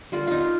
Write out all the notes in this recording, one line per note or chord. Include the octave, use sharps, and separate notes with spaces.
D3 G3 A#3 F4
D#4 F4